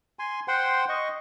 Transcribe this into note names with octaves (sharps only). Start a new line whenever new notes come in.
G#5 C6
C5 F#5 G5 C6
D#5 C#6